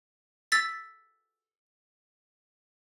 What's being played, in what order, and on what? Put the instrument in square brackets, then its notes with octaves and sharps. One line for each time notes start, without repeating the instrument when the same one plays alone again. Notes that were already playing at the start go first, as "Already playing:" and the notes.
[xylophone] E6 A6 B6